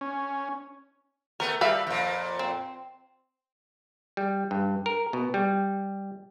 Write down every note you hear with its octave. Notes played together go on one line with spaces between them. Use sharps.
C#4
A3 B3 A#4
G3 B4 E5 F5
F2 A#2
C4
G3
G2
A#4
B2
G3